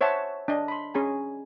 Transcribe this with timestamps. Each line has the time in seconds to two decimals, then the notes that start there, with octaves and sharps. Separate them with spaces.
0.01 C5 C#5 E5 F#5 A5
0.48 D4 D#5
0.68 B5 C6
0.94 C#4 G#4 G#5 A#5